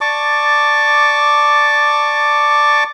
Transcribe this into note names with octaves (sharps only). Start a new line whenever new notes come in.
D5 A5 C#6 D6